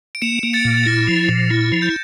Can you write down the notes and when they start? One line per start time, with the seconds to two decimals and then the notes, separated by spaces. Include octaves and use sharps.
0.15 D7
0.22 A#3 C#7 E7
0.43 A#3
0.53 A6 C#7
0.65 A#2
0.74 A6
0.86 E4 A#6
1.07 F3
1.18 A6
1.29 A#2
1.50 E4 A6
1.72 F3
1.82 G6